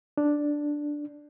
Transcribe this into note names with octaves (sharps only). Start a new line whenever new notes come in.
D4